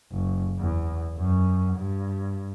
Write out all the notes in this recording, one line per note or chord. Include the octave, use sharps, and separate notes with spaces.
F#1
E2
F#2
G2